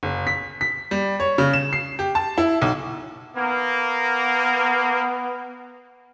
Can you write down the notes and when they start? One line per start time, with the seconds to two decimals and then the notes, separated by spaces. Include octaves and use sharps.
0.03 F#1
0.27 B6
0.61 B6
0.91 G3
1.20 C#5
1.38 C#3
1.53 E7
1.73 C7
1.99 G4
2.15 A5
2.38 E4
2.62 B1
3.37 A#3 B3